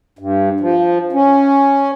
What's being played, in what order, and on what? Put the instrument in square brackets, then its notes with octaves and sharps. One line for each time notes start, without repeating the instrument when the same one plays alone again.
[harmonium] G2
F3
C#4